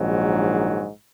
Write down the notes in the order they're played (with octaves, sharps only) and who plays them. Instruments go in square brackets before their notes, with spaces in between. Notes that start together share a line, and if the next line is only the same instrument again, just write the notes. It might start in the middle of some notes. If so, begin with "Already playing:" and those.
Already playing: [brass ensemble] A#1 G#2 D#3 F#3